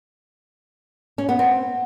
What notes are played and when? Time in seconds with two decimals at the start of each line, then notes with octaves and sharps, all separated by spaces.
1.18 C#4
1.29 B3
1.39 C4